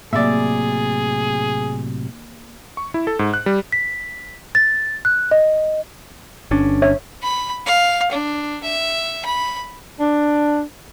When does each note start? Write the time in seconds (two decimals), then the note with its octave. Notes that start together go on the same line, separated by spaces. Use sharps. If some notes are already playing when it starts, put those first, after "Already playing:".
0.13 A2 C3 F#3 A#3 G#4 D5 E5
2.77 C#6
2.94 E4
3.07 A4
3.19 G#2
3.34 F#6
3.46 G3
3.72 B6
4.55 A6
5.05 F#6
5.31 D#5
6.51 G1 C#4 D4
6.82 C#5 E5
7.23 B5
7.66 F5
8.11 D4
8.63 E5
9.25 B5
10.00 D4